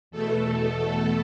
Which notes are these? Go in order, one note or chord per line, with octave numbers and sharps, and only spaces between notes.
E2 B2 A3 A4